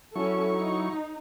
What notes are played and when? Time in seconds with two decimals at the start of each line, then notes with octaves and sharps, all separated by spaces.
0.15 F#3 C#4 E4 A4 C#6
0.53 D#4